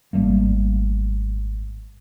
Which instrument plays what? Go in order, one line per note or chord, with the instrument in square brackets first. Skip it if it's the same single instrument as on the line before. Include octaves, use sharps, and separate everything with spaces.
[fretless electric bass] G#1 G3 A3 A#3